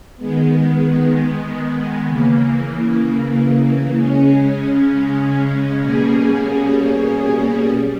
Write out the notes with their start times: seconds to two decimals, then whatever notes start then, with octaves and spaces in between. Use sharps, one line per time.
0.17 D#3 G#3 B3
2.05 C#3 E3 A#3
3.93 C#3 G#3 C#4
5.81 B2 G3 A#3 C#4 G#4
7.69 G3